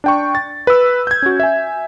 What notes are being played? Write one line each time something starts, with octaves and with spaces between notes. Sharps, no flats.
D4 G5 C#6
A6
B4 E6
G6 G#6
C#4 F#4
E5 G#5